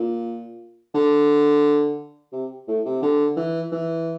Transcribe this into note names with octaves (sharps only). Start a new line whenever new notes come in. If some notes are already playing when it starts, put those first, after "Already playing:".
Already playing: A#2
D3
C3
A2
C3
D3
E3
E3